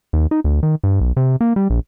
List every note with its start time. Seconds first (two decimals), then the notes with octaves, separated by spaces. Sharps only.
0.13 D#2
0.31 D#4
0.44 D2
0.63 D#3
0.84 G2
1.01 B1
1.17 C3
1.41 A#3
1.56 G3
1.70 A#1